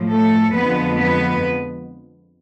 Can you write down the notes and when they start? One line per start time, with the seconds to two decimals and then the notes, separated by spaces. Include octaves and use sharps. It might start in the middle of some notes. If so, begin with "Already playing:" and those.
Already playing: A2 F3
0.09 A3 A4
0.52 F2 D3 F3 G#3 B3 B4
0.95 B3 B4